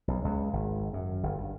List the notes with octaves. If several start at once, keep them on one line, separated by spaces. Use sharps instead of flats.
B1
C#2
G#1
F#2
G1
G2